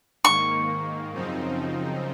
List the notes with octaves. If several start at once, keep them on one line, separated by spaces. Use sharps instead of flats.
G#2 D#3 A#3 C#6
F#2 C#3 F3 C4 D#4